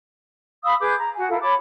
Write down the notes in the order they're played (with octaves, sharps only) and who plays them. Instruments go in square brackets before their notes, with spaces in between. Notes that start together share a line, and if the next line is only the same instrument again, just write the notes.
[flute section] F5 B5 D#6 E6
G#4 B4 D6 G6
A#5
F#4 G#5
E4 F4 A4 A#4
C#5 A5 B5 D6